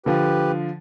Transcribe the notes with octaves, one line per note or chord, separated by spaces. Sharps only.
D3 F3 G4 B4